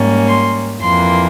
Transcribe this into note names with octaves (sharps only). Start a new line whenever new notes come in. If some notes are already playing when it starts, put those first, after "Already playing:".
Already playing: G#2 G3 A#3 C#4
C6
F2 E3 A#3 C6